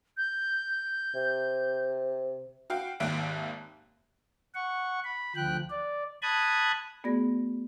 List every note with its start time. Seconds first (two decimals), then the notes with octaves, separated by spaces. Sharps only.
0.17 G6
1.15 C3
2.70 F#4 F5 G5
3.00 G#1 D#2 E5 F#6 D7
4.55 F#5 C#6
5.04 B5
5.36 D2 F3 G5 F#6
5.70 D5
6.22 A5 B5 D#6 F#6 G#6
7.04 A3 B3 F#4 G#4 D5 A#6